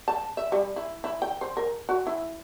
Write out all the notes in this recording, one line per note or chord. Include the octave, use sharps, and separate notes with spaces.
A5
E5
G3
E4
E4
G5
C5
A#4
F#4
E4